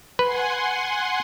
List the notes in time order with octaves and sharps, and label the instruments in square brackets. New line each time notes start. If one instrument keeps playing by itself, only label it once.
[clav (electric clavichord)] B4 [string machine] F#5 G#5 C6